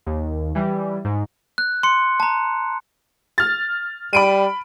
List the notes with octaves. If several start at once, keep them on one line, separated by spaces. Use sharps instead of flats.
D#2
E3 G3
G#2
F#6
C6 C#7
A5 A#5
F6 A6
G3 B5 D7 D#7